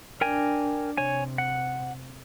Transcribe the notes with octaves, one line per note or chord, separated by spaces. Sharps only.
D4 A#4 G5 G#5
C3 C#5 G#5
F#5